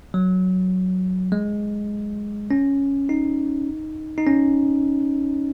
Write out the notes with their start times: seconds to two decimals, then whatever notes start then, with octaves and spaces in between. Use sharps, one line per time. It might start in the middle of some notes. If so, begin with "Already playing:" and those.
0.14 F#3
1.32 G#3
2.51 C#4
3.09 D#4
4.18 D#4
4.27 C#4